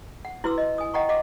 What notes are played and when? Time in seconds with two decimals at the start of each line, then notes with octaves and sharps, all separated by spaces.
0.25 F#5
0.44 E4 F#4 B4 C6 D6 E6
0.58 D#5
0.78 G#5 D#6
0.94 D#5 F#5 G5 A#5 C#6
1.09 F#4 D#5 F5 F#5 D6